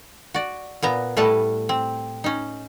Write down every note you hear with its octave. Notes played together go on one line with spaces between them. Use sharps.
F#4 D5
A#2 B3 A#5
A2 G3 A3 A4 B4 A5
C4
C#4 D#4